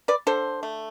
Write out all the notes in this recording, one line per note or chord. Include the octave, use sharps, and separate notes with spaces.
B4 D5
D3 A4 C5
A3